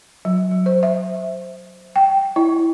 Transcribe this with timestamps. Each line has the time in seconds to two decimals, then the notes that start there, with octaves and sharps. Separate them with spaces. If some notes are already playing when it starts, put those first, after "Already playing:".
0.25 F#3
0.51 F#3
0.66 C5
0.83 E5
1.96 G5
2.36 E4